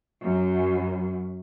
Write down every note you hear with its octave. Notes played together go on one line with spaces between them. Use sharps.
F#2